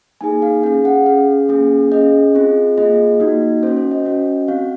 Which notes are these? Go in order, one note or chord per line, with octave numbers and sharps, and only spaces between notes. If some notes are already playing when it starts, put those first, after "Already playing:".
A#3 D#4 G#4 G#5
F5
C#4 G#4 F5
F#5
C#4 G#4 F5
A#3 C#4 G#4
C#4 G#4 D#5
C4 F4 G#4
A#3 F4 G#4 D#5
A#3 D#4 F#4
C#4 F#4 C5
C5
D#5
C#4 F#4
C4 F#4 F5